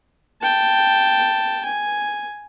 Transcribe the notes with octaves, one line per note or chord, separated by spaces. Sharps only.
G5 A5
G#5